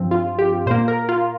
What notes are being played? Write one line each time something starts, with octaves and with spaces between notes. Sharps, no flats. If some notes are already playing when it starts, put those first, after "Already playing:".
Already playing: G2 F3 C4
F4
G4
A#2 A#3 C5
A#4
F4